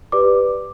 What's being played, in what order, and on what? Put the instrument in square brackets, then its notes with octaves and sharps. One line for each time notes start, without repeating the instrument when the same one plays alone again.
[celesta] G4 B4 D5 D6